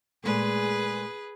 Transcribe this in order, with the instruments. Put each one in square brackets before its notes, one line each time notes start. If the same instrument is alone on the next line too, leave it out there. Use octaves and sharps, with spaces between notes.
[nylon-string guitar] A#2 G#3 A3 [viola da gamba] G#4 B4